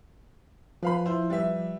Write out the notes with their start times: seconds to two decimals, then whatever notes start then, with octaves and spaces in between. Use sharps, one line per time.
0.83 F3 B4 F5 B5
1.05 E4 F4 C5
1.30 G3 B4 E5